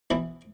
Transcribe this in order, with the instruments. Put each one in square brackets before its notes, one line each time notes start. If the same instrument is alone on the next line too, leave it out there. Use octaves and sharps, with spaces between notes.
[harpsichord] B2 E3 E4